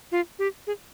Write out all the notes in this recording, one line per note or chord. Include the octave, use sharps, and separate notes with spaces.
F4
G4
G#4